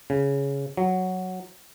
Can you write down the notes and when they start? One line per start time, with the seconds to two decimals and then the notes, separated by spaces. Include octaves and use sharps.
0.10 C#3
0.77 F#3